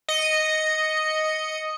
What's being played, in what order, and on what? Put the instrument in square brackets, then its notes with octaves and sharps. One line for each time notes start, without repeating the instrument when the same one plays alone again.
[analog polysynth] D#5 C#7